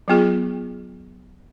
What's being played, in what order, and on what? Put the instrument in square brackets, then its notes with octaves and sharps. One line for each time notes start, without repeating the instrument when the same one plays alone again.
[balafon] F#3 B3 F4 G#4